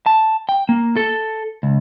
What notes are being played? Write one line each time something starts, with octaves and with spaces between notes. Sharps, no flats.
A5
G5
A#3
A4
C#2